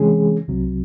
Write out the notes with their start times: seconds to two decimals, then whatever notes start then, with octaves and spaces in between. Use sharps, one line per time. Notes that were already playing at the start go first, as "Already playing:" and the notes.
Already playing: C3 E3 G#3 C#4 G#4
0.48 C2 C3 F#3